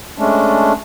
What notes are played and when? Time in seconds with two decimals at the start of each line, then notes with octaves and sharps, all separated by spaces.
0.18 G#3 A3 C#4 D4